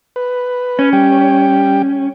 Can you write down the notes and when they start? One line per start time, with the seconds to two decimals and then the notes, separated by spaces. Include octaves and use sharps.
0.16 B4
0.79 C#4
0.93 G3 G5